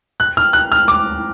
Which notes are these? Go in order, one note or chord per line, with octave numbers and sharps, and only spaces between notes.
F#6
F6
F#6
F6
D6